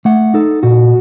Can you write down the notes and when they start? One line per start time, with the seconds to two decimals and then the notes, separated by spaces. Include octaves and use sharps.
0.05 A3 F#5
0.34 D#4 A4
0.63 A#2 F#4